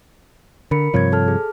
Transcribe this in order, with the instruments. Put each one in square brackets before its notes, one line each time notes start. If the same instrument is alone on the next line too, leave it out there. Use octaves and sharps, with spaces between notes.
[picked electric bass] D3 [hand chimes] A#4 B5 C#7
[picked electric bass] G2 C3 F3 [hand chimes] C#5 G#6
[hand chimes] A4 A5 F6
G#4